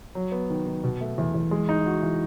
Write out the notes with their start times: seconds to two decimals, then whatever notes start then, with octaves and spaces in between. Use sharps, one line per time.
0.15 F#3
0.32 B3
0.50 D#3
0.66 D#3
0.84 B2
1.01 A3
1.18 E2
1.35 E2
1.51 G#3
1.69 D#4
1.86 F#4
2.03 E3